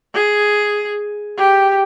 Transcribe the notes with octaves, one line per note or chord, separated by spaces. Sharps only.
G#4
G4